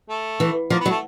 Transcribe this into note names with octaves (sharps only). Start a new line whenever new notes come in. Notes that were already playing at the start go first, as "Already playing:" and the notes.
A3
E3
F3 A#3
B3
F#3
A3